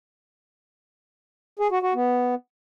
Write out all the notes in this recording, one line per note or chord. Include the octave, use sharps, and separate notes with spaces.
G#4
F#4
F#4
B3